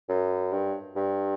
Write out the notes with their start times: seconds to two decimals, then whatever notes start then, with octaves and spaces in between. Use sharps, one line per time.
0.09 F#2
0.52 G2
0.96 G2